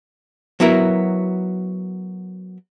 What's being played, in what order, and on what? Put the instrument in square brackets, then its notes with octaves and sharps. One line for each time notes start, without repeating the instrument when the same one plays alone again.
[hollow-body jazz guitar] F#3 B3 E4 F#4 A#4